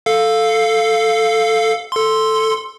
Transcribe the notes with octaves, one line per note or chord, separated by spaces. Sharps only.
A4 F5
A4 C6